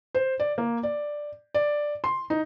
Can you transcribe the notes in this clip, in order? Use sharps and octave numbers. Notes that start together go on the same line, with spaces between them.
C5
D5
A#3
D5
D5
C6
D#4